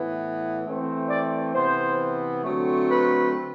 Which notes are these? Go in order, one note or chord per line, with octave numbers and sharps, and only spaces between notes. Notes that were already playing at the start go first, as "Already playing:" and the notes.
Already playing: A2 E3 B3
E3 A3 C4
D5
C3 E3 B3 C5
D3 F#3 A3 C4
B4